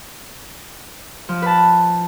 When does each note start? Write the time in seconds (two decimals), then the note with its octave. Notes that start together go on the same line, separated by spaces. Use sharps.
1.29 F3
1.42 B4 A5